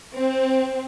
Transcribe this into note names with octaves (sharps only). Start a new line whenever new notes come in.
C4